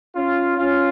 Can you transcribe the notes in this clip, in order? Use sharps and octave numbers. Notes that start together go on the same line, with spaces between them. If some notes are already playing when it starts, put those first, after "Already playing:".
C#4 F4
C#4 F4